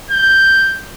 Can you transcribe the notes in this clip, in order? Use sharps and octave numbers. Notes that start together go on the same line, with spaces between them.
G6